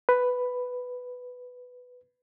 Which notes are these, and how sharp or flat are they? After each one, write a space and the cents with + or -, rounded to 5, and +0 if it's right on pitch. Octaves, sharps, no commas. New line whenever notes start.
B4 +5